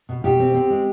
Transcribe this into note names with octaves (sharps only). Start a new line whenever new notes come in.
B2
B2 G4
C4
C4
G#3